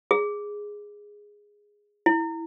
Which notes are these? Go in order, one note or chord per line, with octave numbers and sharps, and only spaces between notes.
G#4
E4